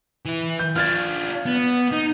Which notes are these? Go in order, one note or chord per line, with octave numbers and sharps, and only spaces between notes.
E3 E4
G6
D4 F4 F6 G#6 A6
B3
D#4